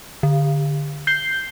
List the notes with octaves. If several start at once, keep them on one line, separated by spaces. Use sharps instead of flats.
D3
G6 C7 G7